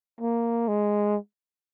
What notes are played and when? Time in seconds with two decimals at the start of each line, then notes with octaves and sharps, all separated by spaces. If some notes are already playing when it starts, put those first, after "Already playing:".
0.21 A#3
0.68 G#3